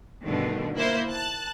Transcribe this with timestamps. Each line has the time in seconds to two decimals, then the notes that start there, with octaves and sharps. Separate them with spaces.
0.24 G2 B2 D3 D#3 A3
0.74 A#3 E4 C5
1.09 A5 F#6